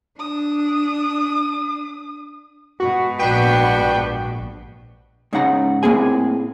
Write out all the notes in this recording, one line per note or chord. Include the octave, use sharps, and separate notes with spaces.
D4 D#6
G#2 B2 F#4
A#1 B3 D4 F#4 G5
G#2 C#3 D#4 F#5 A#5
A2 A#3 C4 G#4 G#5